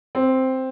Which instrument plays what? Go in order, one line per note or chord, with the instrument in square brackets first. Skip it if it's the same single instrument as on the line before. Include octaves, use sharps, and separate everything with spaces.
[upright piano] C4